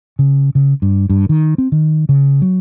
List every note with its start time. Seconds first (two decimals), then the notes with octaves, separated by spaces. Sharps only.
0.19 C#3
0.55 C#3
0.82 G2
1.10 G2
1.29 D#3
1.58 C4
1.72 D#3
2.09 C#3
2.42 F#3